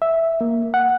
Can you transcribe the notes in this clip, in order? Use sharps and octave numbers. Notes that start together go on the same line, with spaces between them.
E5
A#3
F#5